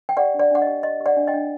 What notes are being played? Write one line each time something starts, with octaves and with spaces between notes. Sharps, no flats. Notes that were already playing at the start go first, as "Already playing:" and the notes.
G5
G4 D5 F#5
D4
D5 F#5
D4 F#5
D#5
G4
G4 D#5
G4
D5 F#5
D4
D#5 G5
D4